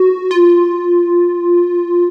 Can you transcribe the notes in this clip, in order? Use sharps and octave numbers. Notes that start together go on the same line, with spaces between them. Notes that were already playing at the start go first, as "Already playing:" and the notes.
Already playing: F#4
F4